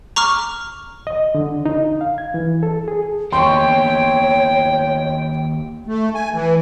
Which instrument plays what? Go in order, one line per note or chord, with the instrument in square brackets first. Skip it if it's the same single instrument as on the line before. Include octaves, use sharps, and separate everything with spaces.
[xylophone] A#5 C#6 D6 F6
[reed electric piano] D#5
D3
D#4
F5
G#6
E3
A4
G#4
[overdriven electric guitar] D#2 B3 [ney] C#5 [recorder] G5 [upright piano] C6 C#6
[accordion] A3
G#5
E3